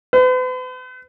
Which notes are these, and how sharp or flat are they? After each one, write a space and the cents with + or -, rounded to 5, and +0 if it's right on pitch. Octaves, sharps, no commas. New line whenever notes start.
B4 +45